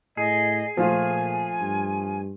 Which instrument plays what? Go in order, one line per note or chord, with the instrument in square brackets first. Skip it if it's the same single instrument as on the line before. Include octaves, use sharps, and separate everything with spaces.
[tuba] A2 [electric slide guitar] G#4 [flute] D#5
[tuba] A#2 [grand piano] F3 A3 F4 [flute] G#5
[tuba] G2